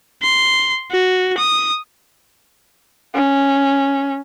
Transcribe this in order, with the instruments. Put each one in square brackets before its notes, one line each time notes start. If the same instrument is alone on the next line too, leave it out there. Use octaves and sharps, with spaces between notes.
[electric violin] C6
F#4
D#6
[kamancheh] C#4